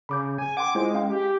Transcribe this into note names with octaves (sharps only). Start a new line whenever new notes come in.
C#3 B5 D6 G6
G#5
F#5 G5 C6 D6
G#3 E4 F4 C5
C#4 F5 G5
G4